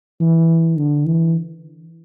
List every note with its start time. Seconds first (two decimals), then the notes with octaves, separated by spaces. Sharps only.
0.21 E3
0.78 D3
1.06 E3